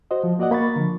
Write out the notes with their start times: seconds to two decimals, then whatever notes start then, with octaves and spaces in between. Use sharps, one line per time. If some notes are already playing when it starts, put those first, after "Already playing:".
0.11 F#4 C5 D#5
0.24 F3
0.39 A#3 F#4 D5 D#5 F#5
0.51 A#3 B5 C#6 A6
0.76 D3 F3